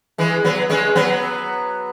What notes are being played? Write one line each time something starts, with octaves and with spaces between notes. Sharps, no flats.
E3 G#3
F#3 B3
G#3 C#4
F#3 B3